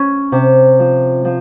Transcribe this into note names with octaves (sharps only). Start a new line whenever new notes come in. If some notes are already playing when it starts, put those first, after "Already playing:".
Already playing: C#4
C3
F3
F3